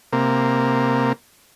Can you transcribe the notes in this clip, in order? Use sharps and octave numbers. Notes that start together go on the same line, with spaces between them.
C3 A#3